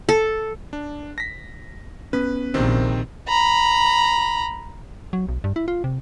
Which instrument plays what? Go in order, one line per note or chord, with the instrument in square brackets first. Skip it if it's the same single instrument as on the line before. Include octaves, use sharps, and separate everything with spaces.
[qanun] A4
[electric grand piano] D4
A#6 B6
[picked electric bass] B3 C#4 [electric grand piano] B4
[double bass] A#1 [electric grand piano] C3 D#3 C4
[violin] A#5 B5
[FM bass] F#3
B1
G2
E4
F4
C3